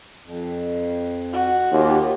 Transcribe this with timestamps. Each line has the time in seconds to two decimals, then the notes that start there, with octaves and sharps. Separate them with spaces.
0.23 F2
1.33 F#4
1.72 D#2 F4 G4